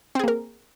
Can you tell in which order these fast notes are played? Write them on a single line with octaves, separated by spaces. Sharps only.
C4 G#4 A#3 A#4